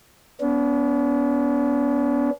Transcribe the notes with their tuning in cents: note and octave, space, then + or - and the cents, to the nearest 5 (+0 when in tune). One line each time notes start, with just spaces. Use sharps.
B3 +0 D4 -45